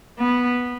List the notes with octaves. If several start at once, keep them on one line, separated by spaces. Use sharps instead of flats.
B3